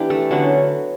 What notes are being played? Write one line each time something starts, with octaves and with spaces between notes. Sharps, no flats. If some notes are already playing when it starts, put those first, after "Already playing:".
Already playing: E3 B3 D4 E4 G4
A3 A4
D3 F#3 B3 C#4 D4 C#5